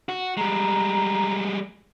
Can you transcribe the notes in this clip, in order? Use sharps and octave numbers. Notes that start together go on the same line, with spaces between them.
F#4
G3 G#3 A#5